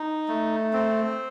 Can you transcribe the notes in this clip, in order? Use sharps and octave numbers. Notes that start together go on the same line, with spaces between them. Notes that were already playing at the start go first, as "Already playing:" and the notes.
Already playing: D#4
A3
C4